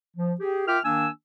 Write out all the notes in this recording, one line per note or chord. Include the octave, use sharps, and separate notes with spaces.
F3
G4 G#4
F4 A#4 E5 G5 D6 F6
D#3 A#3 D4 G#5 E6